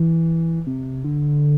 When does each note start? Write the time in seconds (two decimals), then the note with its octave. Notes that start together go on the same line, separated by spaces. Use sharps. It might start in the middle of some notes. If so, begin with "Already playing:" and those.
Already playing: E3
0.67 C3
1.04 D3